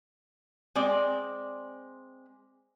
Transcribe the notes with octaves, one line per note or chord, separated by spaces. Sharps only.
G#3 C4 D5